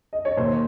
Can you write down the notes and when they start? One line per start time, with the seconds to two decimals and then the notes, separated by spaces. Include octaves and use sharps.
0.13 D#5
0.25 C#5
0.37 D#2 C5